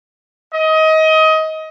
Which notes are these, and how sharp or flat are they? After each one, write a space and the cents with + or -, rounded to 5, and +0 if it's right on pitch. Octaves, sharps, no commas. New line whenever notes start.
D#5 +25